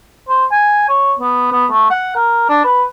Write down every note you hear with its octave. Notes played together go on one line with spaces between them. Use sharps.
C5
G#5
C#5
B3
B3
A3
F#5
A#4
D4
B4